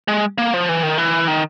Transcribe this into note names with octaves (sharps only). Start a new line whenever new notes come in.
G#3
A#3
F3
E3
D#3
E3
D#3